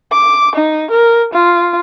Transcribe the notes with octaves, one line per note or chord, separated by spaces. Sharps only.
D6
D#4
A#4
F4